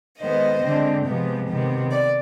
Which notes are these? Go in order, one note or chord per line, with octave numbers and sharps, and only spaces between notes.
D#3 G#3 B3 C5 D#5
D3 G#3 C4
C3 F3 G#3 B3
C3 D#3 B3
D5